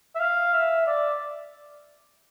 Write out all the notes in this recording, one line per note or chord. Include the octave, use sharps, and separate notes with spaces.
E5
F5
E5
D5